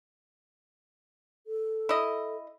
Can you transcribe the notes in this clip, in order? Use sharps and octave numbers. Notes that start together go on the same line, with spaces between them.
A4
E4 D#5